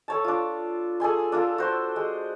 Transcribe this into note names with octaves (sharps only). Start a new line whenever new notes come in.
A4 C#5 A5
D4 F4
G#4 A4 G#5 C6
D4 F4 A4
F#4 C5
G#3